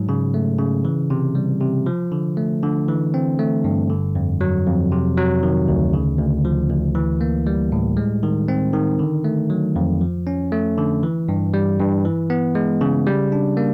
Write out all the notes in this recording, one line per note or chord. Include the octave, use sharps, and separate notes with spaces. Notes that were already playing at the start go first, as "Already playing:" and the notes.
Already playing: G#2 F#3
C#3
A3
C#3
E3
C3
G3
C3
F3
D3
A3
D3
E3
C4
A3
G2
D3
F2
F#3
F2
C3
F#3
D#3
D2
C#3
D2
F3
D2
E3
A#3
G3
A2
G#3
D#3
C4
D#3
D3
A3
F#3
F2
F3
C#4
A3
D3
E3
G2
G3
G2
E3
B3
G#3
C#3
G3
D4
A#3